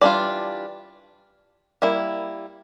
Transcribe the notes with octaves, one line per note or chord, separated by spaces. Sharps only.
E3 G3 D4 F4 D5
G3 A#3 E4